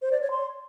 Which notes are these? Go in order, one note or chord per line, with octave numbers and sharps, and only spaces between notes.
C5
D5
C#5
C6